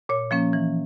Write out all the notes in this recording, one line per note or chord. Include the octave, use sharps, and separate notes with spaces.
A#2 C#5
F3 A#3 C#4
E3